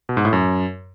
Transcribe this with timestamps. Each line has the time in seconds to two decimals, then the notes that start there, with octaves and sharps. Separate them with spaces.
0.09 B2
0.17 G#2
0.25 A2
0.33 F#2